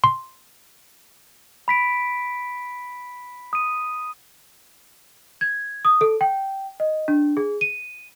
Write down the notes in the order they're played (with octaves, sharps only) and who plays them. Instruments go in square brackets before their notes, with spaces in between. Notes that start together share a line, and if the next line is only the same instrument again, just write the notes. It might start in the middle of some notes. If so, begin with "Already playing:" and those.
[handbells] C6
[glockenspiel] B5 B6 D7
D#6 D#7
[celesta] G#6
D#6
A4
G5
D#5
D4
G#4
D#7